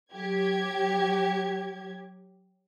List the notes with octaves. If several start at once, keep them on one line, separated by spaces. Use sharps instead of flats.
F#3 G4 G#6